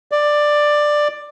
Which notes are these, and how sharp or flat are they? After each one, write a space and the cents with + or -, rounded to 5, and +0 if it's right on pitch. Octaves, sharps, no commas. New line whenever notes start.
D5 +10